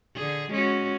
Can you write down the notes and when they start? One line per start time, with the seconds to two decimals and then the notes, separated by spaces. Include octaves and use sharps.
0.16 D3 G#4
0.51 G#3 C#4 F#4